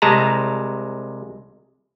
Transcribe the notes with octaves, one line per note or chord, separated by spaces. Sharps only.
C2 C3 G#3 A5 A#5